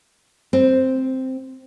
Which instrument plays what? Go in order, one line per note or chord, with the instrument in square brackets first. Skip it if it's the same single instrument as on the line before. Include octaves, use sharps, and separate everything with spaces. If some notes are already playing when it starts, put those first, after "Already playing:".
[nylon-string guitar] C4